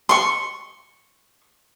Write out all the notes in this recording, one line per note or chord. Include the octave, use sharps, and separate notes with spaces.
C6 C#6